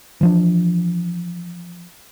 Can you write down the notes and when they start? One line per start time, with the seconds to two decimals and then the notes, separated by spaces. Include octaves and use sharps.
0.21 E3 F3 D4